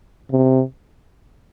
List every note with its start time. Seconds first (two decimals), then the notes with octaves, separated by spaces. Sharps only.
0.31 C3